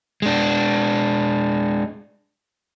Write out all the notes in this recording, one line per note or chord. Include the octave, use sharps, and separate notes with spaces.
G#3 D4